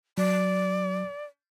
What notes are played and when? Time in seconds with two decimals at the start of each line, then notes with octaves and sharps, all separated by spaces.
0.18 F#3 D5